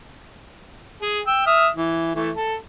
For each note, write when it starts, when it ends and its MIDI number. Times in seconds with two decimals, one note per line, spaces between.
1.02 1.20 68
1.27 1.43 79
1.27 1.43 88
1.46 1.68 76
1.46 1.68 87
1.46 1.68 89
1.76 2.12 52
2.15 2.30 52
2.15 2.30 57
2.36 2.55 69